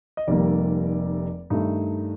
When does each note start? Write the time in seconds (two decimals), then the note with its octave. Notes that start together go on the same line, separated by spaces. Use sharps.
0.17 D#5
0.27 F1 F2 D#3 G3 A#3 D5
1.50 G2 D#3 A3 D#4